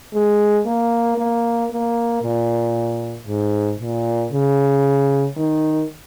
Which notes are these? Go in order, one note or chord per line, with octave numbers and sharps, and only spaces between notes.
G#3
A#3
A#3
A#3
A#2
G#2
A#2
C#3
D#3